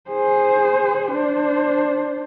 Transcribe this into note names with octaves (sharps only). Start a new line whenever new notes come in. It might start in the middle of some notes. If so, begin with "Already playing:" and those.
G#4 C5
D4 C5